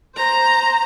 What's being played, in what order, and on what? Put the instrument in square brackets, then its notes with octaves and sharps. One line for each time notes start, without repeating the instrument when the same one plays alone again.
[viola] C5 A#5